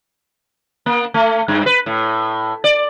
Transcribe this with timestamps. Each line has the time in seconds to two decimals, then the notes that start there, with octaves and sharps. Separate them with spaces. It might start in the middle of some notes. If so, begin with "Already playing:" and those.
0.86 A#3
1.14 A3
1.48 G2
1.66 B4
1.86 A2
2.64 D5